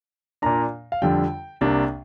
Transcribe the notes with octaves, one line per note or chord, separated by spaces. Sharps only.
A#2 A#3 D4 A#5
F5
F2 D3 G3 G5
C2 C3 A#3 D4